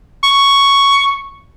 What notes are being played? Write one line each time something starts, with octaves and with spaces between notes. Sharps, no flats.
C#6